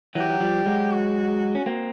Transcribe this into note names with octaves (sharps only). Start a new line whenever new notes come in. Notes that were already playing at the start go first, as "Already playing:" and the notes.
E3 F#3 G4
F#3
F3 G3
F#3 G#3
F#4
C#4
A#3 C4